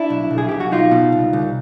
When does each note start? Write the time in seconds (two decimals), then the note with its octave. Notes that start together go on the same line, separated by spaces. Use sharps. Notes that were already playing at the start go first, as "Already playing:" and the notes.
Already playing: D4 E4
0.10 B1
0.31 B1
0.38 G#4
0.49 B1 G4
0.60 F#4
0.72 B1 D#4 F4
0.91 B2
1.12 C2
1.33 C2